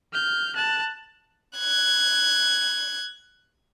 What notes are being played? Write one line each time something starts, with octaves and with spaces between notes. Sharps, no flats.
F6 G6
A5 F#6
F#6 G#6